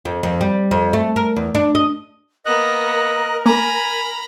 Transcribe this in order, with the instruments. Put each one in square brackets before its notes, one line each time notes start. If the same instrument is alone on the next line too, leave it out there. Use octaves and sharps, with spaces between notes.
[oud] F2
F2
G3
F2
A3
A#4
E2
D4
D#5
[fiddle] A#3 B3 [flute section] A#4 [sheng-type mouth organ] D#5 F#6
[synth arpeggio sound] A#3 [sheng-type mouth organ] G#5 [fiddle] A#5 B5